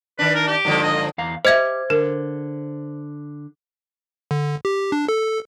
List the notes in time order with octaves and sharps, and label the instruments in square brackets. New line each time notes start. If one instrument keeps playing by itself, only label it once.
[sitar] D#3 D4 [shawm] B4
[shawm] A#4
G4
[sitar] G2 D3 F3
[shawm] D#5
[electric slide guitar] E2 F5 A#5
[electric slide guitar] G4 [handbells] C5 G#6 [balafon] D#5 E5
[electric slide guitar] D3 [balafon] A#4
[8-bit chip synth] D3
G4
D4
A4